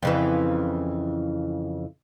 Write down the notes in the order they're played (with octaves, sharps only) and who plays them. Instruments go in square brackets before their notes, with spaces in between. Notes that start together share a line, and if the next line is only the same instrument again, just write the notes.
[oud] F2 C#3 E3